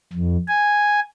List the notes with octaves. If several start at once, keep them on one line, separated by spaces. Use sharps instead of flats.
F2
G#5